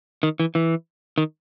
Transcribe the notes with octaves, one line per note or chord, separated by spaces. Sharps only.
D#3
E3
E3
D#3